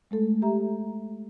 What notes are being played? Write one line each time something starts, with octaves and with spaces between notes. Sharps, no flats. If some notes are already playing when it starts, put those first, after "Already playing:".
G#3 A3 A4
G4 E5 A#5